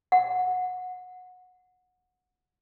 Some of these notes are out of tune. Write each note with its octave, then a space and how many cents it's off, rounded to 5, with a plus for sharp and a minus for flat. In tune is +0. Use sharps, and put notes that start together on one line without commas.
F#5 -20